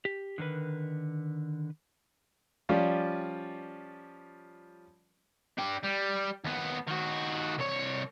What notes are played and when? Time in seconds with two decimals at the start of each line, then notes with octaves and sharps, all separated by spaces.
0.05 G4
0.38 D3 D#3 A#4 B4
2.69 F3 G3 C#4 F4 D5
5.58 D4 G5
5.83 G3
6.45 D#2 B3
6.87 D#3 F#4
7.58 C2 C#5